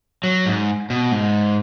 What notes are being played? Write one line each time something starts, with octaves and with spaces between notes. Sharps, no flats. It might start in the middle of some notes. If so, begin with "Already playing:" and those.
F#3
G#2
B2
G#2